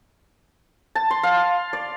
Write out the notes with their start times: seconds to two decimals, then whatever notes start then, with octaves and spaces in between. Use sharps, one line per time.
0.95 A5
1.11 C6
1.23 F5
1.73 D5